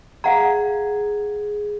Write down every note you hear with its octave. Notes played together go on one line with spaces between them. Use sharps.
G#4 F5 F#5 A#5